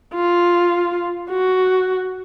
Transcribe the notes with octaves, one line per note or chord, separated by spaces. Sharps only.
F4
F#4